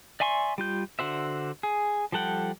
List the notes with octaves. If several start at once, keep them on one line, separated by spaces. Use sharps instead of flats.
D5 E5 G#5 C6 C#6
G3 F4 G6
D3 F#4 C5 E5
G#4
F3 G3 A4 F#5 G5